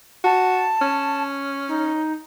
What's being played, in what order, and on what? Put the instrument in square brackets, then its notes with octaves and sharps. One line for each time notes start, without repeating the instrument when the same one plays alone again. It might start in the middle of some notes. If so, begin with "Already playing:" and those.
[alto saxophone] F#4 [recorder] A5
[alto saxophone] C#4
[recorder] D#4